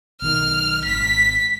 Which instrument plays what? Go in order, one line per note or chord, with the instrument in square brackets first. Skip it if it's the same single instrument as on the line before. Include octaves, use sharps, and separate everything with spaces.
[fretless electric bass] B1 D#3 [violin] F6
[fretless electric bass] G#1 [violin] B6